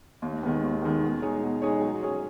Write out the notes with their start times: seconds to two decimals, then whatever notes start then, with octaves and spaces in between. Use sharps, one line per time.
0.22 D#2
0.43 D#3 G#3 B3
0.62 D#2
0.82 D#3 G#3 B3
1.02 B2
1.22 G#3 D#4 G#4 C#5
1.43 B2
1.62 G#3 D#4 G#4 C#5
1.82 F#3
2.02 C#4 G#4 C#5